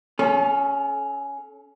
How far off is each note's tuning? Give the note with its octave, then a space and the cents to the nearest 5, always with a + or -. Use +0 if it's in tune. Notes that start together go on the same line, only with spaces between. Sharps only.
C#4 +10 A4 -35